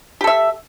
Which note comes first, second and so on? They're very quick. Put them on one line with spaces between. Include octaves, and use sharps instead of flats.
G4 A4 E5